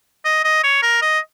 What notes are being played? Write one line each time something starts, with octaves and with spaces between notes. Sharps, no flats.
D#5
D#5
C#5
A#4
D#5